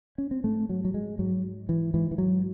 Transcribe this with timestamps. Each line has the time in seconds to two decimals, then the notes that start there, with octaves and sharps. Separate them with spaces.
0.18 C#4
0.31 C4
0.44 G#2 A3
0.69 F#3
0.85 F#3
0.94 G#3
1.19 G#2 F#3
1.69 E3
1.94 G#2 E3
2.11 E3
2.18 F#3